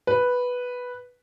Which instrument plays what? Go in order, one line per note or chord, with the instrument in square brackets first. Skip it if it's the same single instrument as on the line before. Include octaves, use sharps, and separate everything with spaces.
[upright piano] B4